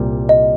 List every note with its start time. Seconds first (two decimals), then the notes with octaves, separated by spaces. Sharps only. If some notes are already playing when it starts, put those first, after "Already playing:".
Already playing: C2 A#2 G3
0.29 D#5